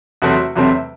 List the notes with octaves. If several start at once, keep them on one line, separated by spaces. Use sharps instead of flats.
E2 C3 F#3 A3 C4 F#4
E2 C3 F#3 A3 C4